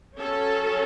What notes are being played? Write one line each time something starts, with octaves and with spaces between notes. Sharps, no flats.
F#3 C#4 A4